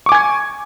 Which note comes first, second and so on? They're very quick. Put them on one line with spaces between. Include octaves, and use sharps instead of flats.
C#6 D6 G#5 G#6